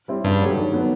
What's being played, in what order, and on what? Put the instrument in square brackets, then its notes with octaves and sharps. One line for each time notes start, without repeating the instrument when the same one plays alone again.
[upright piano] G3 C4 E4
[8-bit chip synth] G2 [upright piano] C#3
[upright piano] F#3 A3 D4 G4
D#3
F#3 B3